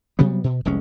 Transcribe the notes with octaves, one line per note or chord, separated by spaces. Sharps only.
C3 F#3 G3 B3
B2
F1 C2 G#3 C#4